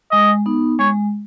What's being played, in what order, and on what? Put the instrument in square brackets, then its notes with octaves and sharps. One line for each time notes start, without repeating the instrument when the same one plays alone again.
[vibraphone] G#3 [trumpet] D#5
[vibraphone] B3 D#4
[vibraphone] G#3 [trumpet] C#5